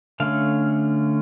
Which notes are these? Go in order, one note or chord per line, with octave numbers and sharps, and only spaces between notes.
D3 A3 C#4 F5